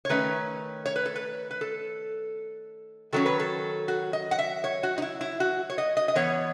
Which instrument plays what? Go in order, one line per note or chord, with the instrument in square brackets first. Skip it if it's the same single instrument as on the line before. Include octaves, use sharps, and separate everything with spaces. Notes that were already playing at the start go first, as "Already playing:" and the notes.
[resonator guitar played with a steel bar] C#5
D#3 A3 C#4 B4
C#5
B4
A4
B4
B4
A4
D#3 F#3 C#4 A4
B4
A4
F#4
D#5
F#5
E5
C#5
F#4
D#4
E4
E4
F#4
C#5
D#5
D#5
D#5
E3 B3 C#5